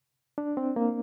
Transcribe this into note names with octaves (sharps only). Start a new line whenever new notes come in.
D4
C4
A#3